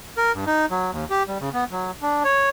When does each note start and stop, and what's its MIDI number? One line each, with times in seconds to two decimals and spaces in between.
0.17 0.32 70
0.35 0.44 43
0.47 0.66 63
0.71 0.91 54
0.91 1.05 39
1.10 1.23 67
1.28 1.38 55
1.41 1.49 49
1.53 1.64 59
1.71 1.91 54
2.02 2.23 62
2.24 2.49 73